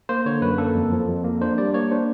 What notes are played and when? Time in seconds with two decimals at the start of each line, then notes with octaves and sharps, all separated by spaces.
0.09 A#3 C5
0.26 D3 C#5
0.42 F#2 B4
0.58 A#3 A4
0.75 F2
0.92 F3
1.08 F2
1.24 A#3
1.41 D4 C5
1.58 G3 D5
1.74 A#3 C#5
1.91 D4 C5